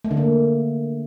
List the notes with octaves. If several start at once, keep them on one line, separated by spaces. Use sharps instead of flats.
A3
D3
A#3